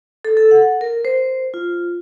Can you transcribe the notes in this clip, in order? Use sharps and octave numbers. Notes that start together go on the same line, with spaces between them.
A4
A4
F#5
A#4
C5
F4